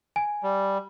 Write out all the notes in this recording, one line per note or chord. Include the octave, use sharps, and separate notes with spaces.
G#5
G3